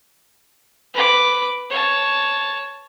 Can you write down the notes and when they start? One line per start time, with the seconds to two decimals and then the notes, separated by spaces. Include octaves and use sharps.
0.94 B4 D6
1.70 C#5 A5